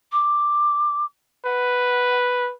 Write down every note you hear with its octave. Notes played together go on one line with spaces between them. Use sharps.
D6
B4 F#5